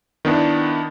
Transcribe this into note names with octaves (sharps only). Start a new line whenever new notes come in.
D#3 B3 D4 E4